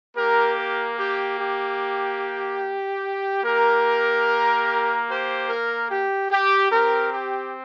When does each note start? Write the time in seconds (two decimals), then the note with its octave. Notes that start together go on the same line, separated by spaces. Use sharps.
0.17 A#3 G4 A#4
0.58 A#4
0.99 G4
1.40 G4
3.44 A#3 G4 A#4
5.08 G4 C5
5.49 A#4
5.90 G4
6.31 G4
6.71 C4 G4 A#4
7.13 G4